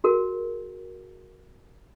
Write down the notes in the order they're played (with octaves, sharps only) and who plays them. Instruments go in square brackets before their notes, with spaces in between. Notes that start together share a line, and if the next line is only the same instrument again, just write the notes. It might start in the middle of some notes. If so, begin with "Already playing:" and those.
[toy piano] F#4 G#4 A#4